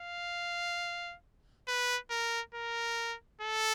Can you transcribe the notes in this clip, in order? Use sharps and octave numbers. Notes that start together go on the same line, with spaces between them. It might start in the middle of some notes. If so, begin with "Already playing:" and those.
Already playing: F5
B4
A#4
A#4
A4